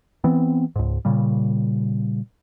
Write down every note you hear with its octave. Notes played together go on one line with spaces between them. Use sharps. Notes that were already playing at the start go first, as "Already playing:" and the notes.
E3 B3 C4
C#2 G#2
A#2 C#3 G3